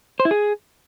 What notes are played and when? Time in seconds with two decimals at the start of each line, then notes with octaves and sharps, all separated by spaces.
0.20 C5
0.25 E4
0.31 G#4